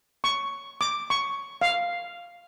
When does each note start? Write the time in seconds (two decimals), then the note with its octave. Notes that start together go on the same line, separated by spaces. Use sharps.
0.24 C#6
0.81 D6
1.10 C#6
1.61 F5